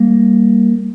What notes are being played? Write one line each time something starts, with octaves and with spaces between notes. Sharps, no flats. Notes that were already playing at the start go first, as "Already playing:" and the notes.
Already playing: G3 A#3